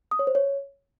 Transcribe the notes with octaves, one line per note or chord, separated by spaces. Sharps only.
D#6
C#5
C5
C#5